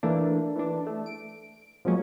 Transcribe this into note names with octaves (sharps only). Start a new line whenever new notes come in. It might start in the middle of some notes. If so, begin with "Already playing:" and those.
E3 A3 A#3 D4
E3 D4
A3
D7
F3 F#3 G#3 A#3 C#4